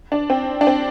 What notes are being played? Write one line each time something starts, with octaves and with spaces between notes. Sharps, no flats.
D4
C4
D4
C4